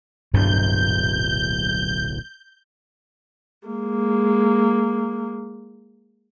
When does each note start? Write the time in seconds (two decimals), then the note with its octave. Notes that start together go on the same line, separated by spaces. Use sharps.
0.34 D1 B1 G2 A#2 D4 G6
3.68 G#3 A#3